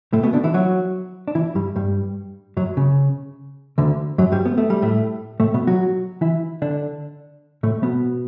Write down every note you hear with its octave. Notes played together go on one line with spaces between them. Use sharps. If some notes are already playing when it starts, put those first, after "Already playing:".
A2 A3
B2 B3
D3 D4
E3 E4
F#3 F#4
D4
E3 E4
G2 G3
G2 G3
F#2 F#3
C#3
D2 D3
F#2 F#3
G2 G3
B3
A3
G3
A2 A3
A2 A3
B2 B3
F#3 F#4
E3 E4
D3 D4
A2 A3
B2 B3